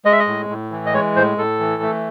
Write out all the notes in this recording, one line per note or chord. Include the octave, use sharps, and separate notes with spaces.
G#3 D#5
E5
D#5
A2
A2
E3
D#5
G#3 C#5
A2 C5
A2 A4
E3
A3